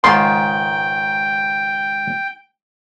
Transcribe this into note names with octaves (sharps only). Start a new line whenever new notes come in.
C#2 G#2 D#3 G5 C6